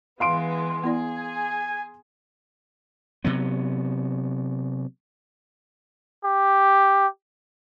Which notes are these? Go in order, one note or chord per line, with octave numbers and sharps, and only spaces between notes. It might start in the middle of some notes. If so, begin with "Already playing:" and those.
E3 G#3 B3 F5 C6 D7
B3 E4 G#4 D5
G#5
C3 F#3 B3
G4